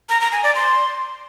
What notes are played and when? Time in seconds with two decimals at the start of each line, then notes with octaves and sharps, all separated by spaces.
0.09 A#5
0.21 A#5
0.32 G#5
0.44 D5
0.55 C6